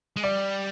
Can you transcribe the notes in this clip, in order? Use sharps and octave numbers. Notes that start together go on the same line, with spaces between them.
G#3
G3 D5